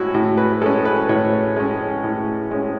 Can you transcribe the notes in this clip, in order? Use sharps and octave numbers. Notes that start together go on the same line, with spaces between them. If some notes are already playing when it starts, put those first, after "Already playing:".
Already playing: A2 G#3 C#4 E4 F#4
A2 F#4
B4
G#3 C#4 A4
B4
A2 C#5
G#3 C#4
A2
G#3 C#4